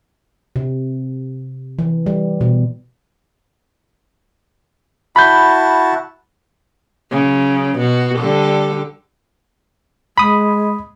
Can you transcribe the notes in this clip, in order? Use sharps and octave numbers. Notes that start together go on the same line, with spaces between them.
C3
E3
G3
B2
E4 F#4 A5 B5 G6
C#3 F#3
B2 F#4
D3 G3 A4
G#3 B5 D#6